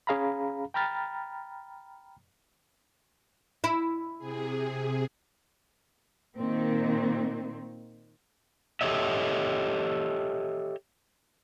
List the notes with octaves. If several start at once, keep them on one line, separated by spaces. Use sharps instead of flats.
C#4 G#4 F5 A#5 B5
G5 A#5 B5 F6 A6
E4
C3 G#4
A#2 D#3 C4
G4 A4 C#5 D#5 E5